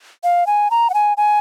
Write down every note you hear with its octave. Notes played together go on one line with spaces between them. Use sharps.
F5
G#5
A#5
F#5
G#5
G#5